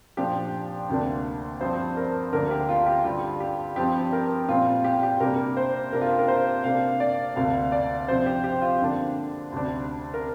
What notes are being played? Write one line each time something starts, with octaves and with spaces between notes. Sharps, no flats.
A#2 F3 D4 G4
D2 C3 A#3 D4
G2 F3 C4 C5
A#4
D2 D3 A#3 D4 A#4
G4
F4
G4
G2 D3 G3 F4
G4
G2 F3 C4 G4
A#4
A#2 G3 C4 F4
G4
G4
C3 G3 A#3 D4 A#4
C5
C3 A#3 D4 A#4
F4
G4
A#4
C5
C3 A#3 D4 F5
D5
D2 C3 A#3 D4 F5
D5
C3 F3 C4 C5
G4
G4
F4
F2 D3 A#3 D4
D2 C3 G3 D4
A#4